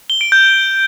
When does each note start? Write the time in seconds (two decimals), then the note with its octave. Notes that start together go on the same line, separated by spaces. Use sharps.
0.10 G7
0.21 D7
0.32 G6